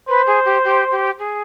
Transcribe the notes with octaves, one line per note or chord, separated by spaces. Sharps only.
B4 C5
G#4
G4
G4
G4
G#4